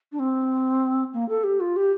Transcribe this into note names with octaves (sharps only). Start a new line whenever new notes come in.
D4
C4
A#3
A4
G4
F4
G4